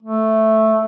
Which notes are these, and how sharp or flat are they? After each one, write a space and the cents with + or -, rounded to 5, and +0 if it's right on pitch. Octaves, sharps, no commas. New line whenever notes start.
A3 +0